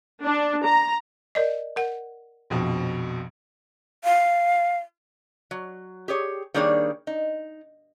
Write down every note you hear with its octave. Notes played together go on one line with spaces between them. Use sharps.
D4
A#5
A#4 D5 D#5
A#4 F#5
A#1 F2 B2
F5
F#3
G4 G#4 C#5
D#3 G3 A#3 D4 G#4 C#5
D#4